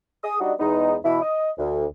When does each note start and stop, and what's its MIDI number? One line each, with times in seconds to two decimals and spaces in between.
0.24 0.37 68
0.24 0.37 87
0.40 0.53 55
0.40 0.53 62
0.40 0.53 63
0.40 0.53 66
0.40 0.53 75
0.59 0.95 40
0.59 0.95 56
0.59 0.95 59
0.59 0.95 63
1.04 1.20 47
1.04 1.20 52
1.04 1.20 64
1.22 1.51 75
1.58 1.85 38